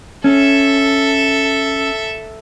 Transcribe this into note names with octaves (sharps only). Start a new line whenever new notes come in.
C#4 A4 E5